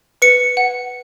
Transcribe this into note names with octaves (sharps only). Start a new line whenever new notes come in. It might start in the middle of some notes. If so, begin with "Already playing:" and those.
B4 C#7
F#5